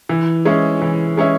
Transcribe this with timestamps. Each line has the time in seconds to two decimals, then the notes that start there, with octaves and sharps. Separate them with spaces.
0.09 E3
0.45 G#3 C#4 E4
0.82 E3
1.17 G#3 C#4 E4